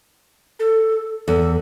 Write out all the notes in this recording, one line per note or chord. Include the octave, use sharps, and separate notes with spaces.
A4
E2 A4